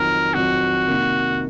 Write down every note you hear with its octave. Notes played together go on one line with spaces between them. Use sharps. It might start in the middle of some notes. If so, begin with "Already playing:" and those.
Already playing: F2 D#3 F#3 C4 A#4
F2 D#3 F#3 C4 F#4
C3 D#3 A#3